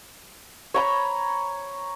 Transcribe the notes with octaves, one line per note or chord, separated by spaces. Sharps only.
C#5 A#5 B5